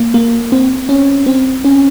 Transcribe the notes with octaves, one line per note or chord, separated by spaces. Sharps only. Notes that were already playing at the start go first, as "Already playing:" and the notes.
Already playing: A#3
A#3
C4
C#4
C4
C#4